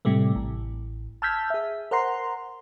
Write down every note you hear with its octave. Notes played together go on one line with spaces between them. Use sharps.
A2 C3 G3 A3
A1
A5 E6 F6 G6 G#6 B6
G#4 E5
A#4 C5 F#5 A#5 C6